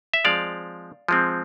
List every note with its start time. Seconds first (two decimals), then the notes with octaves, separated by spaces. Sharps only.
0.14 E5
0.25 F3 G#3 C4 D5 F5
1.08 F3 G#3 C4